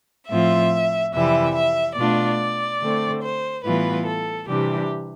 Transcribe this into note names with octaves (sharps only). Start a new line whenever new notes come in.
A2 F3 C4 F4 E5
F2 C3 E3 G3 E5
E5
B2 A3 D4 F4 D5
D3 A3 C4
C5
A2 E3 G3 B3 F4 B4
A4
C3 E3 G3 D4 G4